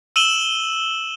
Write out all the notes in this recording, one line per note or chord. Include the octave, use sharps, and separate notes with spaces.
E6 D#7 E7 F#7 G7